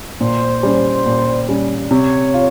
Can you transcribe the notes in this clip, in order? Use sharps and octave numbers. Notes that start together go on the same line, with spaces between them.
A#2 C5
G3 C#4
A#2
G3 C#4
C3 C#5
F4